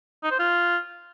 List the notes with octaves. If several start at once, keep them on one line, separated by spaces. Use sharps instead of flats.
D#4
C5
F4